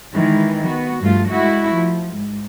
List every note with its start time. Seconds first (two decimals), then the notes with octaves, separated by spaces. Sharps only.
0.14 D#3 E3 G#3
0.65 B3 F#4
1.01 G2 F3 A3 F4
1.31 G#3 A3 E4 F#4
1.73 F3
2.13 G#2